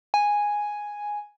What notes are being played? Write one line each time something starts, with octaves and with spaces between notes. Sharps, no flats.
G#5